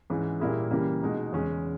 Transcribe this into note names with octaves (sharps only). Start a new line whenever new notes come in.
G#2 E3 G#3 C#4
A#2 G3 A#3 E4 G#4
C#3 E3 G3 A#3
B2 G#3 D#4
E2 C#3 G#3 C#4